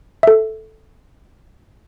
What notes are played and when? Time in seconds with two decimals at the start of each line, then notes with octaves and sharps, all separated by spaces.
0.23 A4 E5